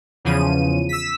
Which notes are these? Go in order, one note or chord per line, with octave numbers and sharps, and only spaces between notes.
E2 C#3 F3 D#7
E6 B6